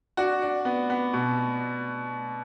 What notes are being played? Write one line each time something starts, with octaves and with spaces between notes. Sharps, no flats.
D4 F#4
D4
B3
B3
B2